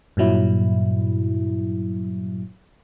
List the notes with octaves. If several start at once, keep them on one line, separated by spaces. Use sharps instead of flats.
G2 A#2 F#3 E4